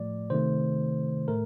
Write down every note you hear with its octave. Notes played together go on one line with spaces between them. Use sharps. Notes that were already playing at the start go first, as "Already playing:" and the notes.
Already playing: A2 F3 A3 D5
C3 D#3 A3 C5
A2 A3 A#4